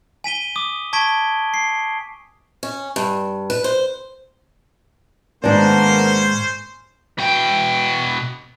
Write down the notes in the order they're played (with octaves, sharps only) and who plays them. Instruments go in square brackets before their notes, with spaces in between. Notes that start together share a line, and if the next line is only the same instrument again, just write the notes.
[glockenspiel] G#5 B6 D#7 G7
D6 D#6
A5 C#6 G#6 B6 D7 G7
C7
[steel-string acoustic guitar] C#4
G2
B4
C5
[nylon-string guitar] G#2 D4 [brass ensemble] D#3 A#3 B3 [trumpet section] C#4 C5
[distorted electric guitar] B2 G5